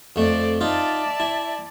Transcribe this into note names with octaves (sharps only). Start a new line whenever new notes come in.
F2 A3 C4 D5
D#4 F4 D5 E5 A5
E4